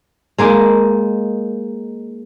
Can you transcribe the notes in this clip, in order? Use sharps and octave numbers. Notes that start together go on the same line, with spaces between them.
G#3 A#3 D#4